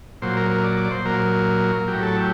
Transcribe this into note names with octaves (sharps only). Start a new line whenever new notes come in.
A#2 F#3 C5
A#4
A#4
D5
D5
C5
A#2 F#3 A#4
A2 F#3 G4
A4
G4